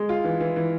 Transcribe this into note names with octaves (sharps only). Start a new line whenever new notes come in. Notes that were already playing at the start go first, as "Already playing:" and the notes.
Already playing: G#3
F4
E3
E3
E3